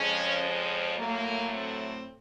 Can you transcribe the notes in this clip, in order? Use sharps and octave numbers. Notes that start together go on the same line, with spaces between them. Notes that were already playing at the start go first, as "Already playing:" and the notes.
Already playing: F2 C#3 F3 G#3 C#4
A2 F#3 A3 A#3
C4